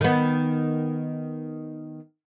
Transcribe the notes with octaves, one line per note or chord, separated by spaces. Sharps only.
D#3 B3